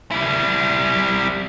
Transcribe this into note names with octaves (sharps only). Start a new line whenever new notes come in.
G3 E4